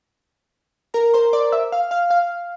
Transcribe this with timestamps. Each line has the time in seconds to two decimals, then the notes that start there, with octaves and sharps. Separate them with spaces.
0.94 A#4 A#5
1.14 C5 C6
1.33 D5 D6
1.52 E5 E6
1.72 F5 F6
1.91 F5 F6
2.10 F5 F6